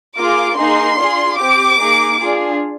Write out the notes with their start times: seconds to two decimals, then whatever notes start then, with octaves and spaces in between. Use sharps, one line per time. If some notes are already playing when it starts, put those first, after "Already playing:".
0.16 A#3 F4 G#4 D6
0.57 A#3 D#4 G#4 C6
0.97 D4 F4 G#4
1.38 C4 G4 D6
1.79 A#3 D#4 G#4
2.19 D4 F4 G#4